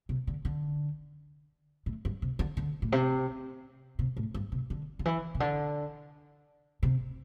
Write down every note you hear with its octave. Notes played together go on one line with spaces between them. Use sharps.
C3
D3
D3
A2
G2
C3
D3
D3
A2
C3
C3
A2
G2
C3
D3
D3
E3
C3
D3
C3